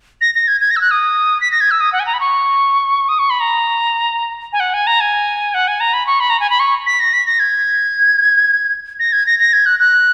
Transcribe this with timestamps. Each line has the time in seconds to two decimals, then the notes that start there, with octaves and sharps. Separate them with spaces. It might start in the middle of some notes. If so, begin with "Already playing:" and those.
0.21 A#6
0.35 A#6
0.48 G#6
0.61 G#6
0.71 A#6
0.76 E6
0.81 F#6
0.91 D#6
1.41 B6
1.51 A#6
1.61 G#6
1.71 E6
1.80 D#6
1.93 F#5
2.00 G#5
2.06 A#5
2.14 B5
2.20 C#6
3.09 D#6
3.19 C#6
3.30 B5
3.40 A#5
4.53 G#5
4.60 F#5
4.74 G#5
4.87 A#5
5.01 G#5
5.54 F#5
5.68 G#5
5.80 A#5
5.93 B5
6.07 C#6
6.20 B5
6.30 A#5
6.40 G#5
6.50 B5
6.60 C#6
6.86 B6
7.00 A#6
7.13 B6
7.26 A#6
7.40 G#6
9.00 A#6
9.13 G#6
9.26 A#6
9.40 A#6
9.53 G#6
9.66 F#6
9.79 F#6